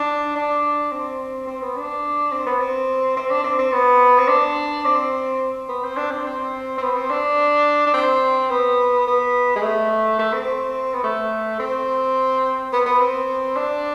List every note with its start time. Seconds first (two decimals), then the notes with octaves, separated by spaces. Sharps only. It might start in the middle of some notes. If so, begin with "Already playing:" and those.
Already playing: D4
0.35 D4
0.92 C4
1.47 C4
1.62 B3
1.76 D4
2.32 C4
2.46 B3
2.59 C4
3.16 C4
3.31 D4
3.44 C4
3.59 C4
3.72 B3
4.18 C4
4.28 D4
4.86 C4
5.69 B3
5.83 C4
5.97 D4
6.11 C4
6.26 C4
6.78 C4
6.82 B3
6.96 C4
7.10 D4
7.86 D4
7.94 C4
8.50 B3
9.07 B3
9.56 G#3
9.62 A3
10.19 A3
10.33 C4
10.93 B3
11.04 A3
11.59 C4
12.72 B3
12.86 B3
13.00 C4
13.56 D4